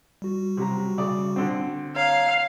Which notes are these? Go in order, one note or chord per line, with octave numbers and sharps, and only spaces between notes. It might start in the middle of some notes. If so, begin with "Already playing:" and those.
G3 F#4
C3 F#3 A#5
C#3 D5
D3 C4
C#5 F5 A#5 G#6